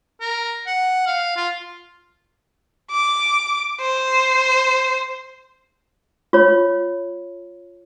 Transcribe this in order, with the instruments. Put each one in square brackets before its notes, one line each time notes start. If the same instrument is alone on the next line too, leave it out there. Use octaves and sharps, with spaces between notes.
[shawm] A#4
F#5
F5
F4
[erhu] D6
C5
[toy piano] F4 C#5